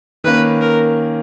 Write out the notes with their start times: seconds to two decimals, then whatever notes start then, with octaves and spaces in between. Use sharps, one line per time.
0.24 D#3 A#3 C#4 B4
0.61 A#4